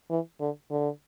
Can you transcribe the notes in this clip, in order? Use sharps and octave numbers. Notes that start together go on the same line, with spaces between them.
E3
D3
D3